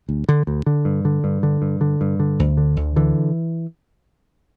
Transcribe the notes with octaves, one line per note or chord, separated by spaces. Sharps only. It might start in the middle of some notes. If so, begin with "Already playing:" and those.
D2
D3
D2
D3
G2
D3
G2
D3
G2
D3
G2
D3
D2
D3
D2
D3 E3